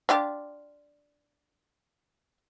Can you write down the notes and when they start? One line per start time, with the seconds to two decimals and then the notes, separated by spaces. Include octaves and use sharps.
0.09 D4 F4 G4